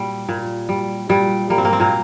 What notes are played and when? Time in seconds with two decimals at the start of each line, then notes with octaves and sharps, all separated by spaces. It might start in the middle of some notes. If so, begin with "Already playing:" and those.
Already playing: A#2 G3
0.29 A#2
0.69 G3
1.09 A#2 G3
1.50 G3 A#3
1.58 C4
1.65 A#3
1.73 C4
1.80 A#2 A#3